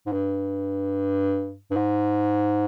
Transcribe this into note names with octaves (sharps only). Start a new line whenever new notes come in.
G#2
G2
G2
G#2